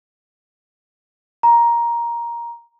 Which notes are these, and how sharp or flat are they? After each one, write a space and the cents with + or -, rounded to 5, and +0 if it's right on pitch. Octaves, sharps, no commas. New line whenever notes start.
A#5 +10